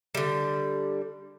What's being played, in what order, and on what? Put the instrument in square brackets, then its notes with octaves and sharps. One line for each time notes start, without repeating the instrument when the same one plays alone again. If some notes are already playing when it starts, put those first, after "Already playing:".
[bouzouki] D3 G3